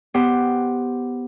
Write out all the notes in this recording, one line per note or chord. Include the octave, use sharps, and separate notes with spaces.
B3 G4 C5 F#5